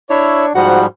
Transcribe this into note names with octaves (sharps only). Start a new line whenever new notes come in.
D4 E4 C#5 E5
G#2 F3 G3 F#4 F#5